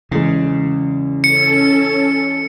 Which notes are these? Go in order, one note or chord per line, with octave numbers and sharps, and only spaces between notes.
E2 C#3 G#3
C#4 A4 C#7